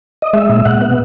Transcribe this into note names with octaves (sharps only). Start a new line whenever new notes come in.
D#5
G#3 E5
A#2
A#2 F#5
B3